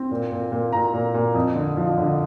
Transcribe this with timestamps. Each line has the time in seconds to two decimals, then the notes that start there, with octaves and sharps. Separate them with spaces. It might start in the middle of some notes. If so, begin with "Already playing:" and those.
Already playing: C4
0.11 A#2
0.31 A#2
0.52 A#2
0.73 A#2 A#5
0.93 A#2
1.14 A#2
1.35 F2
1.55 D3
1.77 F3
1.98 D3